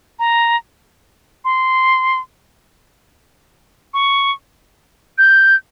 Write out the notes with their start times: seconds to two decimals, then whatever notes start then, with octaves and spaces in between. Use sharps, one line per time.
0.19 A#5
1.44 C6
3.94 C#6
5.18 G6